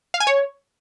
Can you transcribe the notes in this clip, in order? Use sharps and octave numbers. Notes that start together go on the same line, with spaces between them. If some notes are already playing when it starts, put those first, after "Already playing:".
F5
G#5
C#5